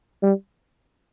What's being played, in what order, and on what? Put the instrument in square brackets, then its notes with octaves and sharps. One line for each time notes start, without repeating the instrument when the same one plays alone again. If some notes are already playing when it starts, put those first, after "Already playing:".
[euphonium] G3